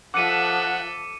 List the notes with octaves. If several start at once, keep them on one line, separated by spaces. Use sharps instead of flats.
F3 A4 E5 F#5 D6 C#7 D#7